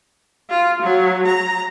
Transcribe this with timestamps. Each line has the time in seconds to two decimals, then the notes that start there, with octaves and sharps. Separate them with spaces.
0.50 F4
0.82 F#3
1.27 A#5